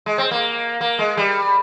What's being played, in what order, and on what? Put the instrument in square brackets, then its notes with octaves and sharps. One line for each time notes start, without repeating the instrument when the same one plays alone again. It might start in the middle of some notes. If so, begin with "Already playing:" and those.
[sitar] G#3
C4
A#3
A#3
G#3
G3